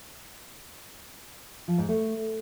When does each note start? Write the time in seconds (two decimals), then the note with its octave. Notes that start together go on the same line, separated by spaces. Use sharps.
1.68 F3
1.78 G#2
1.89 A3